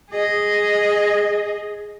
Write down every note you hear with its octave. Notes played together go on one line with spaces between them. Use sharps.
G#4 D#5